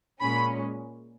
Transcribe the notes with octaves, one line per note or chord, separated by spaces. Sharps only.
A#2 G#3 C#4 B5